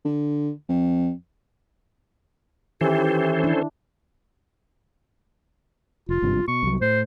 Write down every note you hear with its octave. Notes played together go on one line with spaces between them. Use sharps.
D3
F2
D#3 E3 C#4 G4 A4 C5
D4 E4
F1 F4
G#1 G2 C3
B2 C#6
C2 F#3
A2 C5